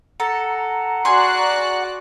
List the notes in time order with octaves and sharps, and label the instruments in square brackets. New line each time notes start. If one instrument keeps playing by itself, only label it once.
[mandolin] A4 [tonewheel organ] F#5 [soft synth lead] A#5
[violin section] F#4 D5 F#6 [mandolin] G#4 C6